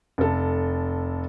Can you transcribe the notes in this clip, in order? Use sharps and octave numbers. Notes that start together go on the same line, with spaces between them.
F1 A4